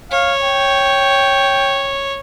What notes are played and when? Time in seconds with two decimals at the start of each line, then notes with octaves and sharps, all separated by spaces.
0.12 C#5 F5
0.43 G5